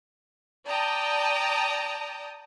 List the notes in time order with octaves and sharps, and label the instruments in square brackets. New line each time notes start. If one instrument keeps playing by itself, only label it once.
[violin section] D5 G5 A5 A#5 D#6